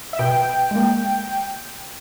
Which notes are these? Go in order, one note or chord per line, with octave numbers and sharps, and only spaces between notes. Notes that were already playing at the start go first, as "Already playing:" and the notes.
E5
B2 B3 G5
G#3
A#3